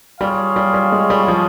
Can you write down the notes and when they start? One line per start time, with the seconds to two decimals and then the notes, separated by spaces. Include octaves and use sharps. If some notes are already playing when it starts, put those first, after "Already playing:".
0.20 G3 F4 G#4 C#5 F5
0.56 G3
0.74 G3
0.92 G#3
1.10 G3
1.28 F3